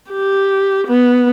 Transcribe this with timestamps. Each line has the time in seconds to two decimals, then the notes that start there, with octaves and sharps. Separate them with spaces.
0.11 G4
0.87 B3